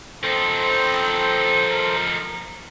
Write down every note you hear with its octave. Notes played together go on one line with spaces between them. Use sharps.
F3 C4 D#4 A4 C5
A#4